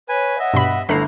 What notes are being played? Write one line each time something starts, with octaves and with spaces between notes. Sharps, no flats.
B4 C#5 G#5
D#5 E5 F#5
G2 B2 B5
G1 A3 E4 A4 A#5 B5 C7